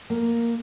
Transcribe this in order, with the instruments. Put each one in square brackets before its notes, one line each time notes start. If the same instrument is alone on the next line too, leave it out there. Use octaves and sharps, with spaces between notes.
[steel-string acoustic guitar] A#3